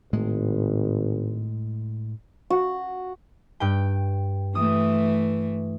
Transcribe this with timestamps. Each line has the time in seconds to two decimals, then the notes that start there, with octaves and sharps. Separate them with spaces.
0.13 G#1 A2 G#3
2.50 F#4
3.60 G2 G5
4.55 E3 A3 D#6